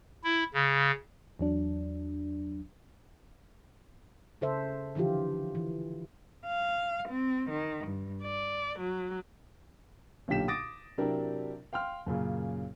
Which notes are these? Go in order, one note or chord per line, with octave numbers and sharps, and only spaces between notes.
E4
C#3
E2 F#3 D4
C#3 A4 C5 E5
D3 E3 F3 F4 G4
E3
F5
C4
D#3
G2
D5
F#3
B1 A#2 D3 G4 B6 E7
D6 D#6 A6 A#6 D7
C3 F#3 D4 E4 G4 A#4
F5 G5 C6 F6
F#2 A#2 C#3